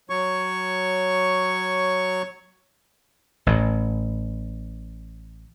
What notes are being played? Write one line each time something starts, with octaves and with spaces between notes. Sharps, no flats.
F#3 C#5 C#6
A1 A2